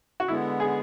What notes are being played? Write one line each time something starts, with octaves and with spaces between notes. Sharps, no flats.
F#4
D3 G#3 B3 E4
G#4